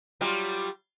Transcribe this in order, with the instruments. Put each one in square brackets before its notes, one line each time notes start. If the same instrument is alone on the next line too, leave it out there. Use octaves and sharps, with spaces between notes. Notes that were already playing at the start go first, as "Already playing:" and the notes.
[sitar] F#3 G3 F4